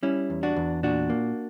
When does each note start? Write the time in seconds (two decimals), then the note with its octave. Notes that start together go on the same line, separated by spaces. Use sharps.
0.03 G3 C#4 E4
0.30 E2
0.43 D4 F#4
0.56 E2
0.83 A#2 D4 F#4
1.10 A#3